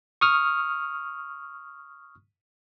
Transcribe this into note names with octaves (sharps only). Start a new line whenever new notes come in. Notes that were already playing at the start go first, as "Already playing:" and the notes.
C#6 D#6 F6